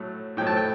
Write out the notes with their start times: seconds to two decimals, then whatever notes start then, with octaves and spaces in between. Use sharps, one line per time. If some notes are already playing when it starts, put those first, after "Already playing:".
Already playing: A2 F#3 A3
0.37 A2 F#3 A3 G5
0.46 A5
0.57 G5